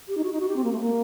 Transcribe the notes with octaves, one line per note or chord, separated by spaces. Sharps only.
G4
D#4
F#4
D#4
F#4
G4
C4
A#3
A3
A#3